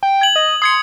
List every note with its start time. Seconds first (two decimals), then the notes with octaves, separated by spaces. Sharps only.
0.03 G5
0.21 G#6 F#7
0.36 D#5
0.62 C6 D#6 G#6 C#7